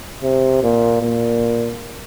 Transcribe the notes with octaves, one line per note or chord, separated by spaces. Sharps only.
C3
A#2
A#2